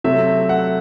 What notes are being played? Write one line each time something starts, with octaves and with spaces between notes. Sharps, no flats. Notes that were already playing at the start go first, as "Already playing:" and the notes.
C3 F#3 A3 E5
F#5